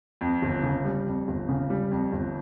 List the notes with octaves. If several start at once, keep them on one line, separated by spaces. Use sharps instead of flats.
F2
G1
C#3
G3
F2
G1
C#3
G3
F2
G1